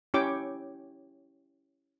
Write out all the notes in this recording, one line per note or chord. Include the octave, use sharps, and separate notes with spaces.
C#4 E4 G4 C#5 G5 D6